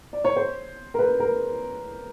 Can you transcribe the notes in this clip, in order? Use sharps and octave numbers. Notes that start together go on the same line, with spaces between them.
D5
C#5
C5
A#4
B4
A#4